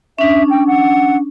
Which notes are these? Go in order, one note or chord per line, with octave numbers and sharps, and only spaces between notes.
C#4 D4 E5
G5
F#5